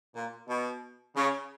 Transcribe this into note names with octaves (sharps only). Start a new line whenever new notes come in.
A#2
B2
C#3